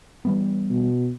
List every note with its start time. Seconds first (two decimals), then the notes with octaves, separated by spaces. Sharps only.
0.25 E3 G3 B3
0.70 B2